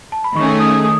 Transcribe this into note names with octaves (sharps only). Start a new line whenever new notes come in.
A5
B5
D#3 A3 C#4 G#4 C#6
D#6
D#6